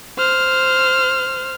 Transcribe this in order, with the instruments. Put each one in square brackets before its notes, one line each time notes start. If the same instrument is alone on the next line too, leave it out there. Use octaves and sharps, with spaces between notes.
[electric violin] C5 F6